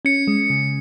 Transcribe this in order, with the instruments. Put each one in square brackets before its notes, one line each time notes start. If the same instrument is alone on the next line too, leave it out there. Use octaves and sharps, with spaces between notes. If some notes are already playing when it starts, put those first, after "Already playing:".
[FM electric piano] C#4 [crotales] C#7
[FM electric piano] G#3
C#3